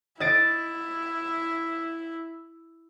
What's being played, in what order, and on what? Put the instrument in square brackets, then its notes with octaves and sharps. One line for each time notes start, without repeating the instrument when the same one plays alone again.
[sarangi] E4 [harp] D#5 A6 D7